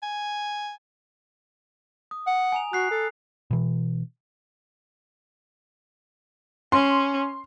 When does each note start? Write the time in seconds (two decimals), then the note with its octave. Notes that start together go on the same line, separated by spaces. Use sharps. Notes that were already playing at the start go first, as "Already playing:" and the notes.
0.03 G#5
2.11 D#6
2.27 F#5
2.52 G#5 A#5 F7
2.73 F#4 F#6 C7
2.91 A4
3.51 B2 E3
6.72 C#4 C6